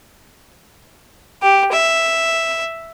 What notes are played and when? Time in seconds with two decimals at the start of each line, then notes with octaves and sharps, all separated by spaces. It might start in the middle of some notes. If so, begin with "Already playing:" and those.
1.42 G4
1.72 E5